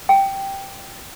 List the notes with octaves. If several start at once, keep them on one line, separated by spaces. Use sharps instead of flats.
G5